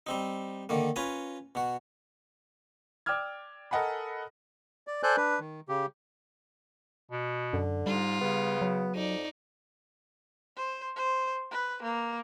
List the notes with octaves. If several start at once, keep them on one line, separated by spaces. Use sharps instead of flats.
G3 C4 D#4
D3 D#3 A#3
C#4 F4 B4 G#5 A#5
B2 F#4
D5 G5 D6 E6 F6 G#6
A4 A#4 D#5 F#5 G#5 B5
D5
A4 C5 D5 G#5 F#6 G6
D4 B4
D#3
C#3 G4
B2
F#2 D3
G#2 G3 F4
C#3 B3
F#3
F2 D#4 D5
C5
C5
B4
A#3